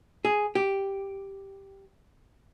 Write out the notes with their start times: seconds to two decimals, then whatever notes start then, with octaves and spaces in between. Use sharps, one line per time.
0.25 G#4
0.55 G4